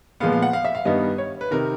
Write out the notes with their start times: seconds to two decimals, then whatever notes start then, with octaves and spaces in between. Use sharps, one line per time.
0.20 A#2 F3 G#3 B3 F5
0.32 F5
0.43 F#5
0.53 F5
0.65 E5
0.75 F5
0.85 G2 D#3 G3 B3 D#5
1.18 C#5
1.41 B4
1.51 C3 D#3 A#4